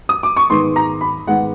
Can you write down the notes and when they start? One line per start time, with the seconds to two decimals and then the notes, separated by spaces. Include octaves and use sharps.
0.09 D#6
0.23 D6
0.37 C#6
0.50 G#2 D#3 G#3 B3 C6
0.76 A#5
1.01 B5
1.27 G#2 D#3 G#3 B3 F#5